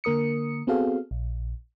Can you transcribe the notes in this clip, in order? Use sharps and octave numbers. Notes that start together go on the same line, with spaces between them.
D3 A#3 A#4 D#6 C#7
B3 C4 F#4 G#4 A4 F5
A#1